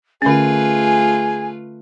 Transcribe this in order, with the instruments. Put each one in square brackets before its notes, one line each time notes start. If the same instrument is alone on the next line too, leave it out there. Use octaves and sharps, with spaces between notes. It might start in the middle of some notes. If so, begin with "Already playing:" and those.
[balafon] D3 C#4 [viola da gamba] A3 F4 B4 [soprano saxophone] G#4 [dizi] G#5